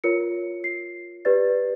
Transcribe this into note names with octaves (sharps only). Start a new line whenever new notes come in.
F4 A#4 C#5 C#7
C7
G4 B4 D5 A6